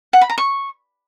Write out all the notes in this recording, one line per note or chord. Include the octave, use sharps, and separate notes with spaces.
F#5
B5
A#5
C#6